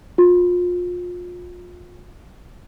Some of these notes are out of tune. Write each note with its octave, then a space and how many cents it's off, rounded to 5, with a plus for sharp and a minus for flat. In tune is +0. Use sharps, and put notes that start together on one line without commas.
F4 +30